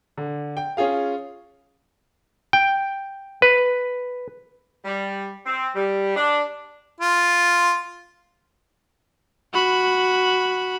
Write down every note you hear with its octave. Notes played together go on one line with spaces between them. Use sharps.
D3
G5
C#4 F4 G#4 F5
G5
B4
G3
C4
G3
D4
F4
F#4 B5